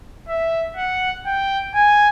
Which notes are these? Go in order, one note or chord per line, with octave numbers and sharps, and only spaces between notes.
E5
F#5
G5
G#5